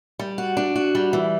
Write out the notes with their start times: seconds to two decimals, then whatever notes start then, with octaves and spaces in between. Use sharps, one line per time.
0.19 G3
0.38 F#4
0.57 D4
0.76 F#4
0.95 G3
1.13 E3